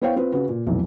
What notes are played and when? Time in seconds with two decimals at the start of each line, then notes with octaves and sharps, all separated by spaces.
0.02 B3 E4 C5 C#5 F5 G5
0.16 C4 F4 B4
0.32 C#3 F#4 B4
0.49 A#2
0.67 F1 B1 E3